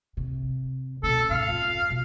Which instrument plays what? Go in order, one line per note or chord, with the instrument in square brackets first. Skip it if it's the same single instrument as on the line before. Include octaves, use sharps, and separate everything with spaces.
[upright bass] C3
[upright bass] B2 C#4 [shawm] A4
[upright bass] G#2 [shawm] F5
[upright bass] F2
B1 B2